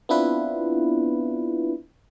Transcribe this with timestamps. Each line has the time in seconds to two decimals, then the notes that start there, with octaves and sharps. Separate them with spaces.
0.09 B3 C4 D4 E4 F4 B4